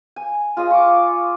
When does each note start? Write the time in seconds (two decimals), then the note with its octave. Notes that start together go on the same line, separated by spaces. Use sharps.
0.16 G#5
0.57 F4 G#4 D#5
0.70 C#6 D6